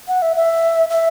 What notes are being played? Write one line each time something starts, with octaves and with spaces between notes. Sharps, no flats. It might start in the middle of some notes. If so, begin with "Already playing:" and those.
F#5
E5
E5
E5